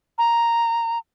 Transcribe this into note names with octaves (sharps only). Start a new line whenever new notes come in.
A#5